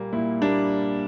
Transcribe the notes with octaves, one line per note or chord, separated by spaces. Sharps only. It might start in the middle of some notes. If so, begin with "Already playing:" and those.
Already playing: A#2 G3 A#3
A#2 E4
G3 A#3 D4